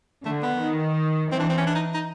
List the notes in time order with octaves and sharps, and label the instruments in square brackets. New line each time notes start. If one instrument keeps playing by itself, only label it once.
[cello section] D3 [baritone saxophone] A3
[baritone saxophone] B3
[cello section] D#3
[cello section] E3 [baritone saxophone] C4
[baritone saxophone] D4
C4
C#4
D4
D#4
D#4